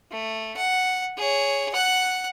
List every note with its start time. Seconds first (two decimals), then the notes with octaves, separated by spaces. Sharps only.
0.11 A3
0.56 F#5
1.17 G#4 C#5
1.73 F#5 F#6